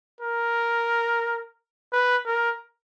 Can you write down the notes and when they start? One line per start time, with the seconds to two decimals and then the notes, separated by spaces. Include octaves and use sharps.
0.21 A#4
1.93 B4
2.26 A#4